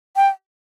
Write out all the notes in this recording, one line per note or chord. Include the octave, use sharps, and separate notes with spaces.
G5